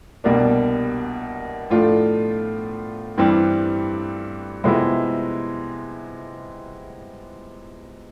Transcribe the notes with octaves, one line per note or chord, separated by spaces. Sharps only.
C2 B2 G3 A#3 D4
A2 F3 A3 D4 F4
G2 E3 G3 C4
C3 F3 G#3 B3 E4